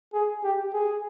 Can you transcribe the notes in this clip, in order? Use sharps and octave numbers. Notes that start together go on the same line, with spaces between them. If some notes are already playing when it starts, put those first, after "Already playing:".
G#4
G4
G#4